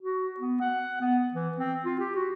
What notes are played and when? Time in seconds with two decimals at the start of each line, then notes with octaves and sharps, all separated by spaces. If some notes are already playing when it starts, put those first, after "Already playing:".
0.01 F#4
0.40 B3
0.61 F#5
1.01 B3
1.34 E3
1.57 C4
1.85 F4
2.00 G4
2.16 F#4